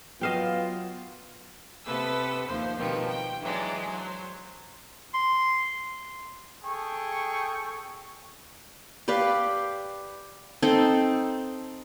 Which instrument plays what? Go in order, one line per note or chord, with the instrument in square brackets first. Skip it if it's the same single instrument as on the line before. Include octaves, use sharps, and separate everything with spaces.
[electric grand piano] F#3 E7 [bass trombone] B3 [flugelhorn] F4 [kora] D#5 F5 G5
[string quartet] C3 B3 A4 B4 E6
D#2 F3 C5 C6
B2 D#3 F3 G3 B3 C4
G5
E3 F#3 G#3 D4
F#3 C5
[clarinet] C6
[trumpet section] G#4 A4 G5 C#6
[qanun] G4 B4 D5 F5
C4 D#4 A4